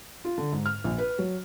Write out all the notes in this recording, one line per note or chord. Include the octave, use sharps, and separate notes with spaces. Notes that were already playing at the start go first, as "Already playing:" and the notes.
F4
D3
G#2
F6
A#1
B4
F#3